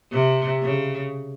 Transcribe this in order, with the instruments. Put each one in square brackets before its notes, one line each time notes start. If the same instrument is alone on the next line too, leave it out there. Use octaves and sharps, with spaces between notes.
[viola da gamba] C3
C#3